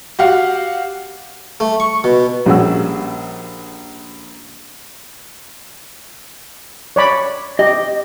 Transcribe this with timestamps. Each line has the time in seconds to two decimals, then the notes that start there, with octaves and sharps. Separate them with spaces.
0.19 F#4 G4 F5 F#5
1.60 A3
1.80 C#6
2.04 B2
2.46 A#1 G3 C#4 F#4 G#4 E6
6.96 C#5 D5 B5
7.59 G4 D#5